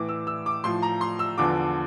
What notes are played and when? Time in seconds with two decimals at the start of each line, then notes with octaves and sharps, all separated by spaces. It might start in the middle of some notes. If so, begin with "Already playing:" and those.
Already playing: A2 E3 D6
0.09 E6
0.27 E6
0.46 D6
0.64 A2 F3 C6
0.82 A#5
1.01 C6
1.19 E6
1.38 E2 D3 F3 D6